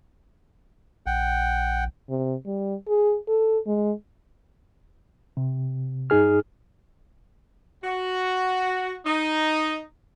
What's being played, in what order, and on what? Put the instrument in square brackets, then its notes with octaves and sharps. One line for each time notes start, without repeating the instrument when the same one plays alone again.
[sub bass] A#1 [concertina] F#5 G5
[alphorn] C3
G3
G#4
A4
G#3
[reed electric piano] C3
G2 D#4 G#4 F6
[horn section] F#4
D#4